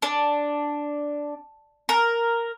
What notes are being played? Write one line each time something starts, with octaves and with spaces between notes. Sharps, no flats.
D4
A#4